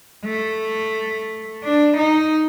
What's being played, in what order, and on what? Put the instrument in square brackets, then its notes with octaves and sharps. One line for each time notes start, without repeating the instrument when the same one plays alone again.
[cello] A3
D4
D#4